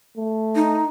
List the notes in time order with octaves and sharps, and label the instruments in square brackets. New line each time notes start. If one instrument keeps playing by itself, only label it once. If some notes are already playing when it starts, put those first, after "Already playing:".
[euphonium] A3
[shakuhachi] D#4